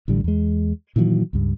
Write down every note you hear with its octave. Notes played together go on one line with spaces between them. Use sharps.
A1 A2 D3 G3
E2 G#3
A#2 D#3 E3 F#3
C#2 G2